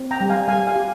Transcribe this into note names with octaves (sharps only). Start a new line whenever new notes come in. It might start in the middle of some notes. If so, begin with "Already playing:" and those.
Already playing: C4
G5 A#5
G3
F5 G#5
G3 F5 G#5
F5 G#5
G4